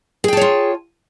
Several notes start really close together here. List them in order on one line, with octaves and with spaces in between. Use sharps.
G#4 G5 A5 C#5 F4